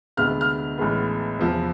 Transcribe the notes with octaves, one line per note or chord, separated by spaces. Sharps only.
D2 C3 G#3 B3 F6
F6
A1 A2 G#3 B3
E2 C3 F3